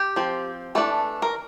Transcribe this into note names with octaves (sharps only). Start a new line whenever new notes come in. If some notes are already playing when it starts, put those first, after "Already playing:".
Already playing: G4
F3 C4
E3 A3 D4 A4
A#4